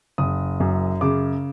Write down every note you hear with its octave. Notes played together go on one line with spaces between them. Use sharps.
F#1 D#6
F#2
C#3 D6